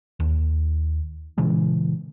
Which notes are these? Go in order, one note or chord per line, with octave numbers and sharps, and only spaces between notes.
D#2
A#2 C#3 E3 G#3